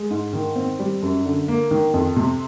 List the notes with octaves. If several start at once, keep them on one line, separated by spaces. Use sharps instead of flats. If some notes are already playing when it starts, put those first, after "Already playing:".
Already playing: G#3
G#2
D#3
C4
G3
F#2
D3
A#3
D#3
F2
C3